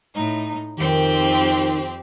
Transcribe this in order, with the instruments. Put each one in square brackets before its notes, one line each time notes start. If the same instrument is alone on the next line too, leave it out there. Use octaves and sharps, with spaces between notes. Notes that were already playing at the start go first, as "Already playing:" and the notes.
[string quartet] A2 D#4
[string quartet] F2 C4 G4 [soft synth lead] D#3